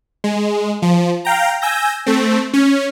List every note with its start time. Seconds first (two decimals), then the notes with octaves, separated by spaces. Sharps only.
0.24 G#3
0.82 F3
1.25 F5 G5 A#5
1.62 G#5 E6 G6 A#6
2.06 A3 C4
2.53 C#4